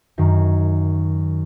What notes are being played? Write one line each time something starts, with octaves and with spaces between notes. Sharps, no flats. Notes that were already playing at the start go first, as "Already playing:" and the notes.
F#2 D#3 F#3